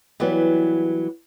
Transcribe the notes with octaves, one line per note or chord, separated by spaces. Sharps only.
E3 F#3 G3 B3